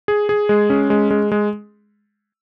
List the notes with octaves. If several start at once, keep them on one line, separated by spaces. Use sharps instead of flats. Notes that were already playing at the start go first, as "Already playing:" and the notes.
G#4
G#4
G#3
C#4
G#3
G#3
G#3